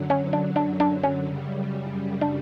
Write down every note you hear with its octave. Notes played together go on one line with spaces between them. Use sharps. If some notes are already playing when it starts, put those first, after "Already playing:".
Already playing: F#2 D3 F#3
C#4
D4
D4
D4
C#4
F#2 C#3 G3
D4